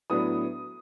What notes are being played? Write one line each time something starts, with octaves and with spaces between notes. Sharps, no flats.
A2 F#3 B3 D4 D#6